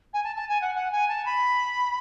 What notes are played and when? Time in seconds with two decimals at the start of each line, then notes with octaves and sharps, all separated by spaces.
0.14 G#5
0.24 A5
0.36 A5
0.49 G#5
0.62 F#5
0.75 F#5
0.92 G#5
1.09 A5
1.26 B5